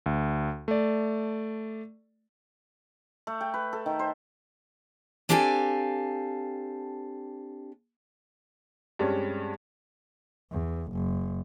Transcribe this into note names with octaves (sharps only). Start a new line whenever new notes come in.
D2
A3 D5
A3
G5
B4
A4
D#3
C5
C4 D4 G4 A4 F5 G#5
G2 G3 G#3 C4 C#4
E2
F#1